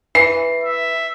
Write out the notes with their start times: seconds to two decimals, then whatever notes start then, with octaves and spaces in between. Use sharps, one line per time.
0.15 E3 C7
0.64 E5